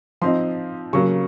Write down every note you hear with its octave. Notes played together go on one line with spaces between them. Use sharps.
F3 C4 D#4 C6
C#3 F#3 A#3 C#6